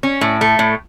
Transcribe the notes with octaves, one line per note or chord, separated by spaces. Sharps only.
C#4
A2
A3
A2